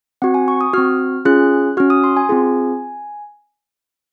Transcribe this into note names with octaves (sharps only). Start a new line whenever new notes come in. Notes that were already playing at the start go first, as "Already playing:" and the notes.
C4 F#4 F#5
G#5
C#6
D#6
C4 F#4 F6
C#4 F4 G#4 F#6
C#4 F#4 F6
D#6
C6
G#5
C4 F4 G#4